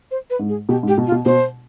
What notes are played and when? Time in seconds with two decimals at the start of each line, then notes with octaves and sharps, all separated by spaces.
0.11 C5
0.30 B4
0.39 G#2
0.49 G#4
0.69 B2 G4
0.83 G#2
0.88 G4
0.98 B2
1.07 F4
1.12 B2
1.26 B2 C5